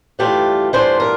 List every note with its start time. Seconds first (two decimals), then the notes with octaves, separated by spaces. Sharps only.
0.19 G2 E3 A3 D4 F4 G4
0.73 G2 E3 A3 D4 F4 C5
1.00 A#4